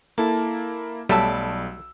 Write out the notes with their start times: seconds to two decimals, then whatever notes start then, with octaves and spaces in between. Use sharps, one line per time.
0.18 A#3 E4 A4
1.09 B1 F#3 G3 A3 D5 A5 B5 E6